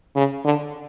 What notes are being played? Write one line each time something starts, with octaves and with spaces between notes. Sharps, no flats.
C#3
D3